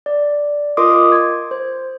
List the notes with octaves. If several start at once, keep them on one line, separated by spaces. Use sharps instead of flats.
D5
F4 A#4 D#5 C6 D6 D#6
G#6
C5